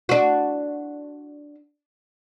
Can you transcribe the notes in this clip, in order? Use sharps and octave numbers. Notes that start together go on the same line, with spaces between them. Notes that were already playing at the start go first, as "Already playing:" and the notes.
D4 F#4